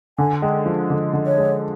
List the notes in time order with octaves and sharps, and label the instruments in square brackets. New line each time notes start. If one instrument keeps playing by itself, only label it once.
[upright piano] D3 [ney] G#5
[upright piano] G#3 [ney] G5
[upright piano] F3
D3
D3
[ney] C#5
[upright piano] G#3